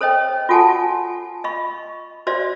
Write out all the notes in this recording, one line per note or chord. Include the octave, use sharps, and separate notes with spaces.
A4 C5 C#5 D#5 G5
F4 F#4 A4 F#5 G#5 A5
D#5 F5 B5 C#6
F#4 C5 D5 D#5 F5